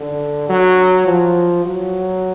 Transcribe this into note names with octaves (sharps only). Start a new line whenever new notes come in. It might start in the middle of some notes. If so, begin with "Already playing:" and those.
Already playing: D3
F#3
F3
F#3